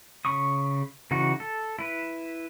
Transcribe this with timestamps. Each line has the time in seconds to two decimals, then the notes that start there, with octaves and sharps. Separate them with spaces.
0.25 C#3 B5 C#6 D#6
1.11 C#3 E3 D#4 F#4
1.40 A4
1.79 E4 B4